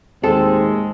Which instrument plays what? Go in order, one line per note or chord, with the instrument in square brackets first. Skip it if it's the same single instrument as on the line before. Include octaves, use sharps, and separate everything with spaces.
[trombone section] D#2 [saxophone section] A2 D#3 G#3 [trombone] C4 [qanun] A4